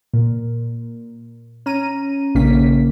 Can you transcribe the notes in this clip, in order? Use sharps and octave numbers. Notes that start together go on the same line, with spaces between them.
A#2
C#4 A#5 D#7
A#1 C#3 A#3 C#4 B6